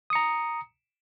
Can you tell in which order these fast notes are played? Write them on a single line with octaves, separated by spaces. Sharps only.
D#6 C#7 A#5